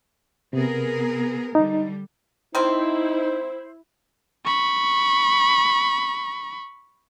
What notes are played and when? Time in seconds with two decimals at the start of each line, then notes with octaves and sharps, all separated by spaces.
0.53 C3 B3 G#4 A#4
1.55 D3 G3 D#4
2.55 D#3 C4 D#4 E4 C5
4.45 B5 C#6